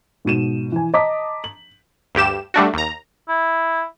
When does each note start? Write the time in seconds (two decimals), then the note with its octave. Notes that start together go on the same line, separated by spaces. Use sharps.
0.25 G#2 B2 D#7 E7
0.72 E3 G#5
0.94 D#5 A5 A#5 D6 D#6 B6
1.44 F#7
2.15 D2 G2 G4 E7
2.54 G3 A3 D4 F#4
2.74 D#2 A#5
3.28 E4